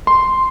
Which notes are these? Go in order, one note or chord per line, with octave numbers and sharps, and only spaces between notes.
C6